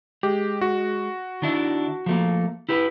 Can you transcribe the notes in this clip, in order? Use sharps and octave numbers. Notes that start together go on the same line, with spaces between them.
G#3 G4
F#4
D#3 D4 E4
F3 A3 A#3
E4 G4 B4